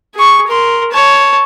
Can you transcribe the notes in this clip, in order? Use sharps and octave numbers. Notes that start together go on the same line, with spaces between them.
G#4 C#6
A#4 C6
C#5 A5